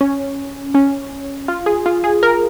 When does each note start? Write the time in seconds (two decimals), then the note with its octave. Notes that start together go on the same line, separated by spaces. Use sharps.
0.01 C#4
0.74 C#4
1.48 F4
1.66 G#4
1.86 F4
2.04 G#4
2.23 A#4